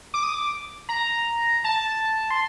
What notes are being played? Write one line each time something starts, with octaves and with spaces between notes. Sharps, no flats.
D6
D#6
D6
A#5
A5
C6